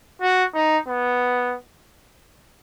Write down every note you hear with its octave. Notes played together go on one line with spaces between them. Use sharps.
F#4
D#4
B3